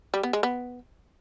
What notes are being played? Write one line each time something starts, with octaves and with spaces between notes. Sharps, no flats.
G3
B3
G#3
B3